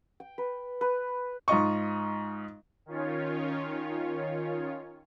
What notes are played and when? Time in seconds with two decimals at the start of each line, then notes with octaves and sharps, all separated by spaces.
0.20 G5
0.38 B4
0.81 B4
1.48 G#2 F4 D#5 C#6
2.86 D#3 C#4 F4 C#5